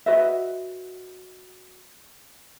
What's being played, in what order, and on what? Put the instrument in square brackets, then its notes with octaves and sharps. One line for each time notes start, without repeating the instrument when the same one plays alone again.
[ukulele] F#4 B4 D#5 E5